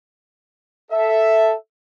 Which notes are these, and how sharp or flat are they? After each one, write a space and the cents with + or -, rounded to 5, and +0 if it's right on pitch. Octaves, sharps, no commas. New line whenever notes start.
A4 +0 E5 +0